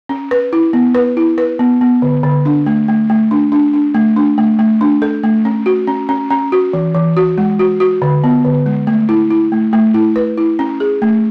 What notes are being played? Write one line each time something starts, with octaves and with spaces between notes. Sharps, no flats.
C#4
B4
E4
B3
B4
E4
B4
B3
B3
D3
D3
D4
A3
A3
A3
D4
D4
D4
A3
D4
A3
A3
D4
A4
A3
C#4
F#4
C#4
C#4
C#4
F#4
E3
E3
F#4
G#3
F#4
F#4
D3
B3
D3
G#3
A3
E4
E4
A3
A3
E4
B4
E4
C#4
G#4
A3